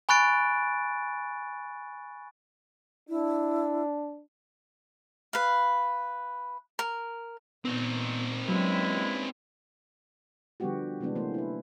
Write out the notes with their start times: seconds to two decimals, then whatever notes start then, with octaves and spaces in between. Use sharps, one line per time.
0.09 G#5 B5 C#6 F#6 A6 D7
3.09 D4 E4
5.33 B4 F5
6.79 A#4
7.65 A#2 B3 C4 D#4
8.48 G2 F#3 G#3 A#3 C#4 E4
10.60 D3 F3 G3 B3 F#4 G4
11.00 C3 E3 F#3 G#3 B3 D4
11.15 E3 A3 A#3 C#4 C5
11.34 E4 B4